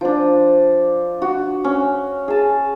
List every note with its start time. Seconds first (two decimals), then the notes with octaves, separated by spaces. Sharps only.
0.01 F3 D4
1.22 F#4
1.64 C#4
2.28 G#4 A5